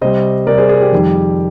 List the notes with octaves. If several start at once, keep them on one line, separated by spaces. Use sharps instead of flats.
C3 G3 C5 D#5
C3 G3 A#4 D5
G#4 C5
G#4
G4
F2 D#3 G3